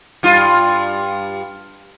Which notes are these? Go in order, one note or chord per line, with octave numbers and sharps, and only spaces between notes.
G2 F4